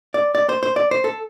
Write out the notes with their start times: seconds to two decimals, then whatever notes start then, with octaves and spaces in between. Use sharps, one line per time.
0.14 D5
0.35 D5
0.49 C5
0.63 C5
0.76 D5
0.91 C5
1.04 A4